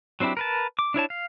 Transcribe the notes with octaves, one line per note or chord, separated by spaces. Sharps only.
F#3 C4 D4 E4 G4
A#4 B4 A5
D6
D4 E4 C#5 A5
F5